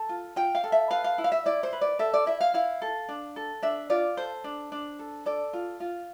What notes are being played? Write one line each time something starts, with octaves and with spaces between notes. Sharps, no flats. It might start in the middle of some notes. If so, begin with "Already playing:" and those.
Already playing: A4 A5
F4
F4 G5
F5
A4
E5
B4 F5
F5
E4
F5
E5
E4 D5
C5
B4
D5
A4 E5
D5
E4 E5
F5
E4 F5
A4
D4
A4
D4 E5
F4 D5
A4 C5
D4
D4
A4
A4 D5
F4
F4